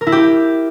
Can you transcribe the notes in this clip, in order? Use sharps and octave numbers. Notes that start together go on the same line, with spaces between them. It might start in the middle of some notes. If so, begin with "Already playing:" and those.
A#4
E4
G4